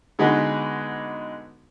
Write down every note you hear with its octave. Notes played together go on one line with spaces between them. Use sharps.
D3 G#3 B3 D#4 F#4 B4